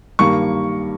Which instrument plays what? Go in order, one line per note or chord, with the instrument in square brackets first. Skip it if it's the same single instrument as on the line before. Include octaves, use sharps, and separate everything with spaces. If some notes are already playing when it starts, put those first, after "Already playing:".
[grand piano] G2 D#3 G3 A#3 C#6